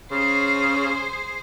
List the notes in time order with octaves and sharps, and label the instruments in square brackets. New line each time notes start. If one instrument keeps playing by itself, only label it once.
[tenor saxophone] C#3 [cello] G#4 C5